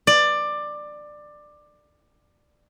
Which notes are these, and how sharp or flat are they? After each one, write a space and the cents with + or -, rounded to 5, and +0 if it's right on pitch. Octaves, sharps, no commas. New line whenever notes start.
D5 +15